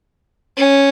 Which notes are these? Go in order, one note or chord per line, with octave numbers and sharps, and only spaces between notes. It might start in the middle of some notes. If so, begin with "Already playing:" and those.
C#4